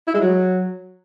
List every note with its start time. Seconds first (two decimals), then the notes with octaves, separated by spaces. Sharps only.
0.07 E4
0.14 G#3
0.21 F#3